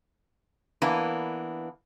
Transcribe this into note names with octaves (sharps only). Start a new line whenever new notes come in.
E3 A#3 B3 D4